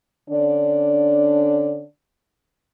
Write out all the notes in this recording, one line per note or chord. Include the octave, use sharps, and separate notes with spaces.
D3 C#4 D4